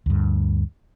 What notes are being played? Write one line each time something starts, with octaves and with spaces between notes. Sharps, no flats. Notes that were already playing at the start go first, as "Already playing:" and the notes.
D2 G2